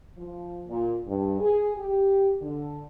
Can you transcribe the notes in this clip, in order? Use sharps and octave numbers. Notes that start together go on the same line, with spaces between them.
F3
A#2
G2
G#4
G4
D3